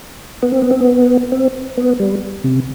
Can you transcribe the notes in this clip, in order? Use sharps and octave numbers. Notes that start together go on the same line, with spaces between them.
B3
C4
B3
C4
B3
C4
B3
G3
C3